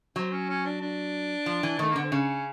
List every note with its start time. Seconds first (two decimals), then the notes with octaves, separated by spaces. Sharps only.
0.16 F#3 C4
0.32 C#4
0.49 C#4
0.66 D4
0.81 D4
1.46 F3
1.63 E3
1.79 D#3 A3
1.90 A#3
1.96 D3 B3
2.04 C4
2.12 C#3 C#4